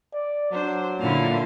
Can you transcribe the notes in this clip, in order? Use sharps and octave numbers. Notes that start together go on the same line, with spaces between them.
D5
F#3 D4 C5
A#2 D3 E4 F5